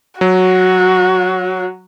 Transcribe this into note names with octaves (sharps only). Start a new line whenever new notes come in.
F#3 F#4